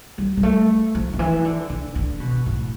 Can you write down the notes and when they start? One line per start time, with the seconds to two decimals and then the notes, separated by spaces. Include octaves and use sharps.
0.18 G3
0.37 G3
0.43 A3
0.95 F3
1.13 D3
1.19 E3
1.45 D3
1.70 D3
1.95 D3
2.20 B2
2.46 A2